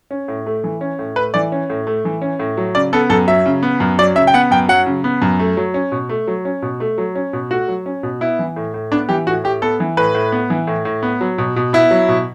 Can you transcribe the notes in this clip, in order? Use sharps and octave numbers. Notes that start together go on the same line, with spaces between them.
C#4
A2
A3
E3
C#4
A2
A3 B4
E3 D5
C#4
A2
A3
E3
C#4
A2
F#3
C#3 D5
B3 A4
F#2 A4
F#3 E5
C#3
B3
F#2
F#3 D5
C#3 E5
G5
B3 F#5
F#2 G5
F#3 F#5
C#3
B3
F#2
A3
F#3
C#4
B2
A3
F#3
C#4
B2
A3
F#3
C#4
B2
A3 F#4
F#3
C#4
B2
B3 E4
E3
A2
A2
B3 D4
E3 G4
A2 F#4
A2 G4
B3 A4
E3
A2 B4
A2
B3
E3
A2
A2
B3
F#3
B2
B2
B3 E4
F#3
B2